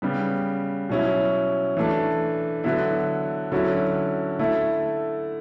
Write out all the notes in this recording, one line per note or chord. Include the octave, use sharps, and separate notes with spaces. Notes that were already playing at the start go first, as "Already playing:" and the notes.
C#3 G3 B3
B2 F#3 C#4 E4
E3 A3 D4
D3 F#3 B3 E4
D3 F#3 C#4 E4
D3 A3 E4